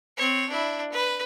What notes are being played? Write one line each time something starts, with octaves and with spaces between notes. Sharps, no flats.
C4 C#5
D4 E4
B4